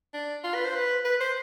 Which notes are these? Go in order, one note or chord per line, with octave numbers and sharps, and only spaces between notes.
D4
F4
B4
C5
B4
B4
C5